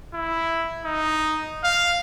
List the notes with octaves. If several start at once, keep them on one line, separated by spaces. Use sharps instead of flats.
E4
D#4
F5